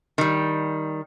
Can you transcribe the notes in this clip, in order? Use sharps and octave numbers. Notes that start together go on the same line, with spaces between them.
D#3 G3